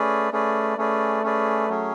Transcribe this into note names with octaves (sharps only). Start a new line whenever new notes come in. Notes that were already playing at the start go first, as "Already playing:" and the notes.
Already playing: A3 C#4 G#4 B4 D5
A3 C#4 G#4 B4 D5
A3 C#4 G#4 B4 D5
C#4 G#4 B4 D5
F#3 C#4 G#4